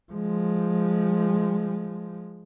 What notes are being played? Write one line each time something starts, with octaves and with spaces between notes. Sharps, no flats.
F3 G#3